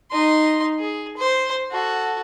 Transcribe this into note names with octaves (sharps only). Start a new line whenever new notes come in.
D#4 C6
G#4
C5
F#4 A4